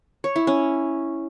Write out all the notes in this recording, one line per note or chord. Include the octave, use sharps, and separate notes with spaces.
C#5
E4
C#4